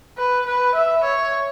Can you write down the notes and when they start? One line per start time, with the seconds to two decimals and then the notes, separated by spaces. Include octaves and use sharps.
0.18 B4
0.46 B4
0.75 E5
1.04 C#5